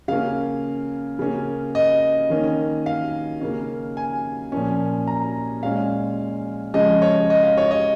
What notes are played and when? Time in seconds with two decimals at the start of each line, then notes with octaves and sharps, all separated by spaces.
0.08 C#3 A#3 C#4 F5
1.19 C#3 A#3 C#4
1.75 D#5
2.30 D#3 A#3 C#4
2.86 F5
3.41 C#3 A#3 C#4
3.97 G#5
4.52 A#2 F3 A#3 C#4
5.07 A#5
5.63 A#2 G#3 C#4 F5
6.74 C#3 F3 G#3 C#4 D#5
7.02 C#5
7.30 D#5
7.43 F5
7.57 C#5
7.71 D#5